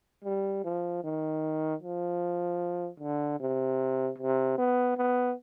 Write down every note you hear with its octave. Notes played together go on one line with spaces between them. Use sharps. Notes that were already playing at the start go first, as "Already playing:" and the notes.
G3
F3
D#3
F3
D3
C3
C3
B3
B3